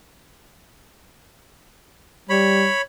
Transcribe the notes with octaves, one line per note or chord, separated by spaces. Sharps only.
G3 C#5 B5